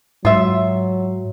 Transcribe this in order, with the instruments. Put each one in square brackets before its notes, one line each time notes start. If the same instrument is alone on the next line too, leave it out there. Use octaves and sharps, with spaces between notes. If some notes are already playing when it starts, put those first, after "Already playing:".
[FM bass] G#2 [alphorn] F#3 [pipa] F4 E5